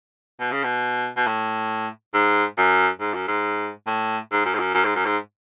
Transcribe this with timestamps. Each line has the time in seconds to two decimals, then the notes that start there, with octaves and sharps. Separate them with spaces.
0.40 B2
0.52 C#3
0.64 B2
1.17 B2
1.27 A2
2.14 G#2
2.57 F#2
3.00 G#2
3.14 F#2
3.27 G#2
3.87 A2
4.32 G#2
4.45 F#2
4.55 G#2
4.60 F#2
4.74 F#2
4.85 G#2
4.95 F#2
5.06 G#2